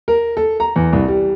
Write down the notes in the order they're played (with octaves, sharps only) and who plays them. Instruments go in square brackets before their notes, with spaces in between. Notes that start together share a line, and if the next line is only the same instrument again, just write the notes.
[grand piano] A#4
A4
A#5
E2
C2
G3